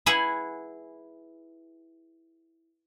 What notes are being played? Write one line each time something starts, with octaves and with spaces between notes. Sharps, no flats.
E4 G#4 B4 F#5 G#5